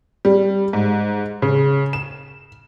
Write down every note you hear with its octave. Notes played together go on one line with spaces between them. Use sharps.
G3
G#2
C#3
E7